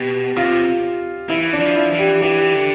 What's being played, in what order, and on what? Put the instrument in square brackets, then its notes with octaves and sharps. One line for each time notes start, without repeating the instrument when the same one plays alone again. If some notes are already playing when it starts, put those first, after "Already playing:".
Already playing: [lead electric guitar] B2 [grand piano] G4
[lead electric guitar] C3 [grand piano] F4
[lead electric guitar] E3 [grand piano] E4
[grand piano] D4
[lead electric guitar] F3
[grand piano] E4
[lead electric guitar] E3
[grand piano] G4
[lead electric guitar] E3 [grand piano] G4
[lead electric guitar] D3